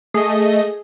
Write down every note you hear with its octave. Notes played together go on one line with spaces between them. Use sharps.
A3 G#4 D#5